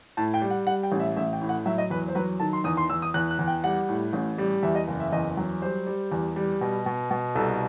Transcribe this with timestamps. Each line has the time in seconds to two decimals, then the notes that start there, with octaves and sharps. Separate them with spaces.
0.17 A2 A5
0.34 G5
0.42 G3
0.50 F#5
0.67 G3 F#5
0.83 G5
0.92 A1
1.00 E5
1.16 A1 E5
1.33 G5
1.41 A2
1.49 F#5
1.66 F#3 E5
1.78 D#5
1.90 E2 B4
2.08 C5
2.15 F#3 B4
2.40 D#3 A5
2.53 C6
2.64 E2 D#6
2.77 C6
2.90 E2 E6
3.02 D#6
3.14 E2 F#6
3.31 F#6
3.39 E2
3.47 G5
3.64 G3 F#5
3.89 A2
4.13 A1
4.38 G3
4.63 E2 E5
4.75 D#5
4.88 F#1
5.00 E5
5.12 E2 D#5
5.37 F#3
5.62 G3 C5
5.87 G3
6.12 E2
6.36 G3
6.61 B2
6.86 B2
7.11 B2
7.35 C2 A4